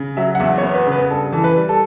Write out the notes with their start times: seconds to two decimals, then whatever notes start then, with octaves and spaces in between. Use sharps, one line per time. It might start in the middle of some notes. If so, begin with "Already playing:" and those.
Already playing: C#3
0.17 F#3 E5
0.35 F#5
0.40 E2 E5
0.58 C#5
0.63 B3
0.74 B4
0.87 C#3
0.92 B4
1.10 G2 A4
1.32 E3 A4
1.44 B4
1.56 G3
1.69 A4